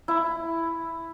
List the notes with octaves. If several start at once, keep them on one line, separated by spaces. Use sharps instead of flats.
E4